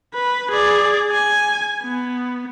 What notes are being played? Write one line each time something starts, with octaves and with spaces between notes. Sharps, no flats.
B4
G#4 D5
G#5
B3